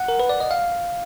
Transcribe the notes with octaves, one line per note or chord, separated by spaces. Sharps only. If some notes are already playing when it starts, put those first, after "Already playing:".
Already playing: F#5
A#4
B4
D5
D#5
F5